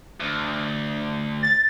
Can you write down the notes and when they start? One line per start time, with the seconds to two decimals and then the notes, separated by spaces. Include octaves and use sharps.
0.20 D2
1.43 A6